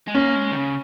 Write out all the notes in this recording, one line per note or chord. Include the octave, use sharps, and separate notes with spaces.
G#3
A#3 C#4
G#3
D#3
C#3